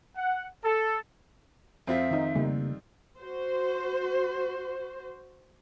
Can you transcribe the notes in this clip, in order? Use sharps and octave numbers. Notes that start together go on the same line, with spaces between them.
F#5
A4
F2 C4 F4 E5
D#3 D#4
C#3 G3 A3 A#3 D#4
F#4 C5